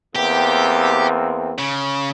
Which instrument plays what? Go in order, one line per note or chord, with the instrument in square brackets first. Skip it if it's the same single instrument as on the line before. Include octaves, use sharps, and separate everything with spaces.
[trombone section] E2 A#3 C4 [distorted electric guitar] G4
[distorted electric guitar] C#3